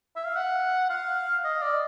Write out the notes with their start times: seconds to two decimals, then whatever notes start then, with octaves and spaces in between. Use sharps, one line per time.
0.16 E5
0.26 F5
0.36 F#5
0.90 F5
1.44 D#5
1.62 D5